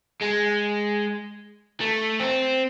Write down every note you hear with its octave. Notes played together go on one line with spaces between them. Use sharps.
G#3
A3
C4